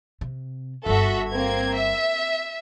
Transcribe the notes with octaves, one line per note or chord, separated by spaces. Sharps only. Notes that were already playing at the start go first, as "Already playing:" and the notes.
C3
G1 G2 F#4 A4 E5
A#3 C4 G#6
E5